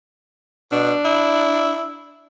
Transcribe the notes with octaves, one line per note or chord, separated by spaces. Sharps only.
B2 D4
E4